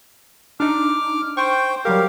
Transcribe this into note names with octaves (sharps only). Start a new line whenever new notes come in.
D4 D#4 D6 F6
C5 G5 C#6
F#3 G3 G4 A#4 F5